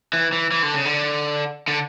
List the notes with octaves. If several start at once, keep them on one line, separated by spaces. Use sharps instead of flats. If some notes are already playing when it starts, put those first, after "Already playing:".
E3
E3
E3
D3
C#3
D3
D3